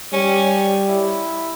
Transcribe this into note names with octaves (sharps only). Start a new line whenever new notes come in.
G3 C#4
E4